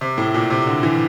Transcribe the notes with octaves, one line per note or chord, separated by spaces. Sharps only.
C3
A2
A#2
C3
D3
E3